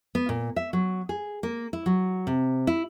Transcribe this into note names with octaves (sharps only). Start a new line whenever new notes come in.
B3
A#2
E5
F#3
G#4
A#3
E4
F#3
C3
E4